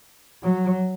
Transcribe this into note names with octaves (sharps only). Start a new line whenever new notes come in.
F#3